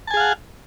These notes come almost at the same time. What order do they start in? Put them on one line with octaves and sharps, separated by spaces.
A5 G#5 G#4 F5 F#5